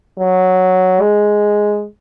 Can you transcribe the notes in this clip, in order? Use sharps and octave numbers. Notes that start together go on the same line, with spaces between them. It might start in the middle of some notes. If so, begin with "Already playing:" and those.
F#3
G#3